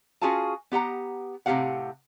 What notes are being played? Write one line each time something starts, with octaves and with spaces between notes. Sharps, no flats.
C#4 F4 F#4 G#4 F5 A5
B3 G4 F#5 A#5
A2 C3 F#4 G4 F5 F#5